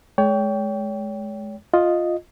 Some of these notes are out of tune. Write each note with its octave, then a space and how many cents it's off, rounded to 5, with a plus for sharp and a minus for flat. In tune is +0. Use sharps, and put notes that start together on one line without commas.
G#3 +25 C#5 +35 G5 +0
F4 +5 D#5 +0